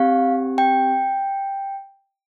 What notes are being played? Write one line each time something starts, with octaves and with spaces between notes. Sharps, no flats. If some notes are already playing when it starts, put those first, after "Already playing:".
Already playing: C4 G4 F5
G5